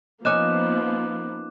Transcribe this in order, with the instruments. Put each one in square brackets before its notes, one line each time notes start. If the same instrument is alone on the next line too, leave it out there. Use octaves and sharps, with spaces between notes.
[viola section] F3 A#3 B3 [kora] C#4 D#4 [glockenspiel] D6 F#6 E7